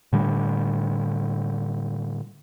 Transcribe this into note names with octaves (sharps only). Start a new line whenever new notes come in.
A2 D3 G3